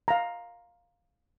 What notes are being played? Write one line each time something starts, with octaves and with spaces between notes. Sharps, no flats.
F5 A#5